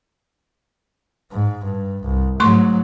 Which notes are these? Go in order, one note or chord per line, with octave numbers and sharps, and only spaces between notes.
G#2
G2
C2
G#2 F#3 A3 C6 C#6